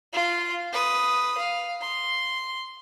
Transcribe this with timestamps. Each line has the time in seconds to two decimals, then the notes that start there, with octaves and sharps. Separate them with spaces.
0.13 F4 C6
0.72 B4 D#6
1.38 F5
1.81 C6